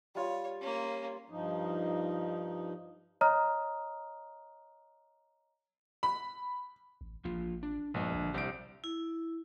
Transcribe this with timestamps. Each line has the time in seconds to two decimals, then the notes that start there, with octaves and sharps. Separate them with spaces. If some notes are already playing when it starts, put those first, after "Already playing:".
0.15 G3 F4 C#5
0.61 A#3 C#4
1.30 G2 F3 D#4
3.21 C#5 D#5 A#5 D#6 F6
6.03 B5
7.01 A1
7.25 A1 F3 A#3 F4
7.63 D4
7.94 A#1 G2 G#3 B3 D#5
8.14 A1 D3
8.34 C2 G4 C5 D5 D7
8.84 E4